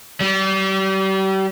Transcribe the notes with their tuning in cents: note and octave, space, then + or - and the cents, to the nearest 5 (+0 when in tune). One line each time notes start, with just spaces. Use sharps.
G3 -35